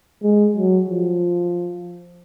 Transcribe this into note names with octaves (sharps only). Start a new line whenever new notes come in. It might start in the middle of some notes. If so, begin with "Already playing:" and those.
G#3
F#3
F3